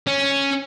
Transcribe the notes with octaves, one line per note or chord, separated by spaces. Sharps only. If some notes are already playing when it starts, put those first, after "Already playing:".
C#4